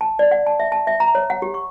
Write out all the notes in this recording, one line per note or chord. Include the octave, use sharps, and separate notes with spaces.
A5
D5
F#5
A5
E5
A5
E5
A#5
C#5
F#5
G4
C#6